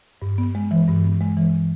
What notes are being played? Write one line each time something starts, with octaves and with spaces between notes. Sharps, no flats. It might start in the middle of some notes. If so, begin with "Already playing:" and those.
G2
B3
G#3
E3
G2
B3
G#3
E3